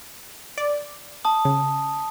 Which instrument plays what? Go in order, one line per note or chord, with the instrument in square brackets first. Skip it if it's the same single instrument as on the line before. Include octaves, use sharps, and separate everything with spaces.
[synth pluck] D5
[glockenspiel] A5 D#6
[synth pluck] C#3